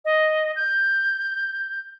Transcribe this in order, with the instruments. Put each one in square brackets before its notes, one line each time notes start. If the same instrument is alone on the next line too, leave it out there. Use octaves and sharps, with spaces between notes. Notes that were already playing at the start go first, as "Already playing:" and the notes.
[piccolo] D#5
G6